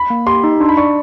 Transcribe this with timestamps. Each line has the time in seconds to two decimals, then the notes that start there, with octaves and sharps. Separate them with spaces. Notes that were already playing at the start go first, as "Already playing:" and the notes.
Already playing: B5
0.10 A#3
0.27 G4 C6
0.44 D#4
0.60 D4 C6
0.69 B5
0.77 D5 C#6